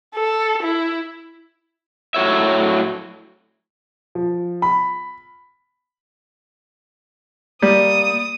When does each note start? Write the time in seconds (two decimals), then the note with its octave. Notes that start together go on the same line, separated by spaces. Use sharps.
0.15 A4
0.63 E4
2.15 A2 F#3 C#5 E5
4.15 F3
4.62 B5
7.62 G3 A#3 D#6